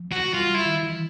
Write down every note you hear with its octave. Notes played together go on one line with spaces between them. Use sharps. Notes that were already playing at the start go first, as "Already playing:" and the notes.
Already playing: F3
F#4
G3 F4
G3 E4
D#3
E3